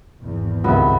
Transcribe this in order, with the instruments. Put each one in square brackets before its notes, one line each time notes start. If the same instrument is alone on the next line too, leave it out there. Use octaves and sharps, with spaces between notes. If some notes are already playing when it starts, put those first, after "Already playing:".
[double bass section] G#1 E2
[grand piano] C#2 E5 [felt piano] G2 D#3 C4 [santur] B3